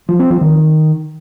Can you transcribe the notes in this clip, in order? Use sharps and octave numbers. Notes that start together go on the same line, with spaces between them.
F3
C4
F3
D#3